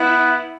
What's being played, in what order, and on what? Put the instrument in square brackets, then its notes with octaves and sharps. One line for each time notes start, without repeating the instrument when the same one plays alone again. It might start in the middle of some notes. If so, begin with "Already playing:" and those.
Already playing: [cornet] B3 [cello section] E4